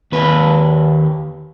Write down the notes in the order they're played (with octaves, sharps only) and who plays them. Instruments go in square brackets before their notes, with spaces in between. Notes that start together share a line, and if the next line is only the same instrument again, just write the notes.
[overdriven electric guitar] D#2 B4